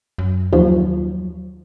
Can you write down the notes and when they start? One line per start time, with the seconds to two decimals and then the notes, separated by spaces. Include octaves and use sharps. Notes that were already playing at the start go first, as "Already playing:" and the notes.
0.18 F#2
0.53 D#2 F3 F#3